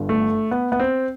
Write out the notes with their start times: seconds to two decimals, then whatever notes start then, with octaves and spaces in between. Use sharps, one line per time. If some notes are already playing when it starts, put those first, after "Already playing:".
Already playing: G1 G2 D3
0.09 A3
0.51 B3
0.72 B3
0.80 C4